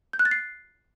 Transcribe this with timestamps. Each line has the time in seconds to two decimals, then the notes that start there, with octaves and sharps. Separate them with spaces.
0.13 G6
0.19 F#6
0.25 A6
0.31 C7